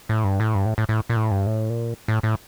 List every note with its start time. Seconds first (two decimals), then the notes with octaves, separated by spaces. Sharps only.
0.09 A2
0.24 G2
0.40 A2
0.55 G2
0.66 A2
0.78 A2
0.89 A2
1.09 A#2
1.16 A2
1.31 G2
1.46 A2
1.70 A#2
2.08 A2
2.23 A2